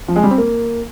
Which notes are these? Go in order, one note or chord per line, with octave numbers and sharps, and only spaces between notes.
F3
G#3
G3
C4
A#3